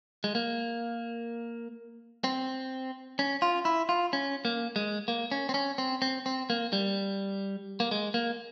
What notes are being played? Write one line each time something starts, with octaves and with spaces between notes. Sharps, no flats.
G#3
A#3
C4
C#4
F4
E4
F4
C#4
A#3
G#3
A#3
C#4
C4
C#4
C4
C4
C4
A#3
G3
A#3
G#3
A#3